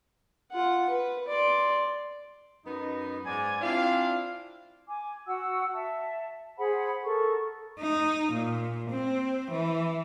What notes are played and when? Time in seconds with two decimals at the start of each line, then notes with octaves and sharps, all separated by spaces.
0.52 F4 F#5
0.89 B4
1.28 D5 C6
2.65 F#2 B3 D#4
3.24 G#2 D5 G#5
3.61 C4 D4 E4 F4 F5
4.88 G#5 D6
5.26 F#4 F#5 E6
5.73 E5 A5
6.57 G#4 C5 F#5 B5
7.04 A4 A#4 C#6
7.80 D#4
8.33 A#2
8.90 C4
9.51 E3